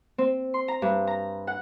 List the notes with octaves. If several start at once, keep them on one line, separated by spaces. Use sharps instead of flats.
C4
C6
A#5
G2
A#5
F#5